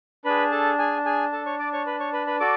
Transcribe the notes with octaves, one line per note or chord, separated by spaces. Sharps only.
D4 G#4 B4 B5
A4 A5
G#4 G#5
G#4 G#5
A4 A5
C#5 C#6
D5 D6
C#5 C#6
B4 B5
C#5 C#6
B4 B5
B4 B5
F#4 A4 D5 D6